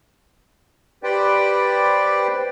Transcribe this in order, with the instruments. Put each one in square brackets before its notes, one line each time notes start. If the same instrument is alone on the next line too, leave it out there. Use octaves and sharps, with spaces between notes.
[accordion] G4 B4 C5 D5 G5